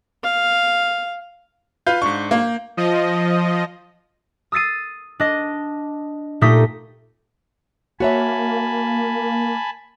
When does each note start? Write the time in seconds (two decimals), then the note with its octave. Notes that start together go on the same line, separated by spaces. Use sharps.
0.23 F5
1.87 F4 B4 F5 G6
2.02 G#2 D4 C#6
2.31 A#3
2.77 F3 D#5
4.52 D#6 E6 A6 C7 D#7
5.20 D4 D#5
6.41 A#2 A3 D#4 G4 D#6 B6
8.00 A#3 F#4 C#5 E5 G#5 A5 B5